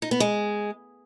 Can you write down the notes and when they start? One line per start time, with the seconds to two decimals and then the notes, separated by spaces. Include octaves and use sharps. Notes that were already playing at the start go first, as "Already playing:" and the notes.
0.02 D#4
0.11 B3
0.20 G#3